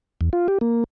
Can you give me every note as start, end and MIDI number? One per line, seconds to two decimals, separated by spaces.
0.21 0.30 40
0.33 0.47 65
0.48 0.58 67
0.61 0.84 58